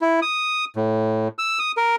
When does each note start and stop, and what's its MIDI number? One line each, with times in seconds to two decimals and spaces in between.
0.01 0.20 64
0.22 0.65 87
0.76 1.28 45
1.39 1.59 88
1.59 1.72 87
1.77 1.96 70